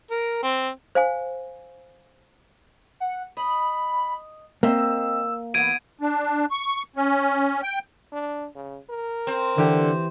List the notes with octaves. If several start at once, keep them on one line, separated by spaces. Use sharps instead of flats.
A#4
C4
C5 F5 G#5
F#5
D#5 B5
A#3 C4 D#5 E5 E6
E3 B3 G#6 D7 D#7
D4
C#6
C#4
G5
D4
C#3
A#4
C4
D3 E3 G4